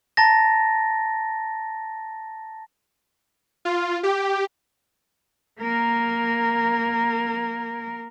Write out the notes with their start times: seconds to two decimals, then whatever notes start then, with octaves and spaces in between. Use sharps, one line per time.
0.17 A5 A#5 A6 A#6
3.65 F4
4.03 G4
5.60 A#3 A#4